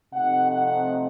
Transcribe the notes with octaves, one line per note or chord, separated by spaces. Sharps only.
C3 F3 A3 C4 D#4 F#5
F#5